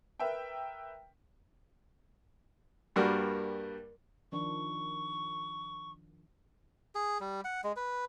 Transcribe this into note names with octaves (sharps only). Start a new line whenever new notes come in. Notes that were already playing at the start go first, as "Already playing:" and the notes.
A#4 B4 E5 G5
G2 G3 A#3 F#4 A#4
D#3 F3 D4 C#6
G#4
G3
F#5
G#3
B4